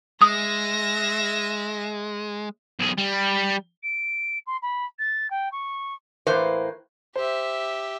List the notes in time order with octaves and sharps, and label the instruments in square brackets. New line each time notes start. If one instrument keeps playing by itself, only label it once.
[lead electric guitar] G#3 [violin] E5 A#6 [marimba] D#6
[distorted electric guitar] B1 G#4
G3
[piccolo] D7
C6
B5
A6
G5
C#6
[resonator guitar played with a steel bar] A2 E3 A#3 B4 C5
[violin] G4 E5 [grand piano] C5